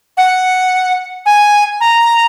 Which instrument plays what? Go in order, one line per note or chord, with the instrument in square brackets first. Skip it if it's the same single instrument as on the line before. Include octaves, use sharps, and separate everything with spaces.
[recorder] F#5
G#5
A#5